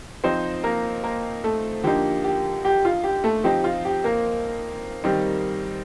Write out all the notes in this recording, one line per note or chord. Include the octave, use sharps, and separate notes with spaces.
F3 C4 D#4 C5
A#3 A#4
A#3 A#4
A3 A4
D3 F3 A#3 D#4 G4
G4
G4
F4
G4
A3 A4
F3 C4 D#4 G4
F4
G4
A#3 A#4
D#3 G3 C4 D#4